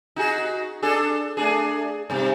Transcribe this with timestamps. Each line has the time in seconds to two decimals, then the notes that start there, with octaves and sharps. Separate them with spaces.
0.16 D#4 F#4 G#4
0.82 D4 G#4 A4
1.37 A3 D4 G#4
2.10 G2 C3